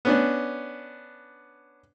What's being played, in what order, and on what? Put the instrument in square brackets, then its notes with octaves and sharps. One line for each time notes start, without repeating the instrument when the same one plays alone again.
[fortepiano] B3 C#4 D4